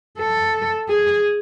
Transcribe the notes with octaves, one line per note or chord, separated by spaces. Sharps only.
A4
G#4